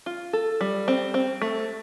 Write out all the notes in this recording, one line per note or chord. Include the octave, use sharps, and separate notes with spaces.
F4
A4
G3
C4
C4
A3